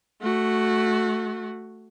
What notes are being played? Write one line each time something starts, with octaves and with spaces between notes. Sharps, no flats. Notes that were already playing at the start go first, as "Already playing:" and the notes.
A3 F#4